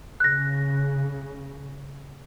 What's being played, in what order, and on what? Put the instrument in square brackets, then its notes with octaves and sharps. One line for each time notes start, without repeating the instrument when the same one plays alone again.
[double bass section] C#3 [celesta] F#6 A#6